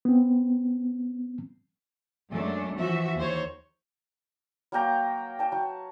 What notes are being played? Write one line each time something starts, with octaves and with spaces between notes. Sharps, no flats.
B3 C4
F#2 F#3 G#3 A3 D4
E3 F3 F#4 E5
D#2 C5 C#5
F#3 A#3 G5 A#5
G5 A5
F#3